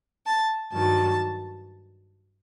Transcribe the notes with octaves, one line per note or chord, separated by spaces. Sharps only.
A5
G2 D#3 F#3 A5